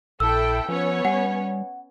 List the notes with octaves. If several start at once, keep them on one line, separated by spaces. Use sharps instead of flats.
A#1 E4 A4 G5 E6
F3 B3 C#4 C#5
G3 F#5